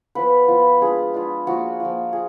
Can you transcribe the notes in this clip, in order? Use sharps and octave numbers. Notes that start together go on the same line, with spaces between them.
F3 B3 F4 B4
F3 B3 F4
G#3 D4 F4 G#4
G#3 D4 F4
F3 A#3 F4 F#4
F3 A#3 F4
F4 G#4